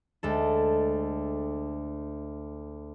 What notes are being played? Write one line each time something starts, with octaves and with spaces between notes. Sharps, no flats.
D2 G#3 A4